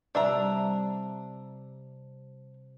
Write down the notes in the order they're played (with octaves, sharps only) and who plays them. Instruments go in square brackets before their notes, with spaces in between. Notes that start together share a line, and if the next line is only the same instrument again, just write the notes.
[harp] C3 G3 [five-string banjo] D4 E5 A#5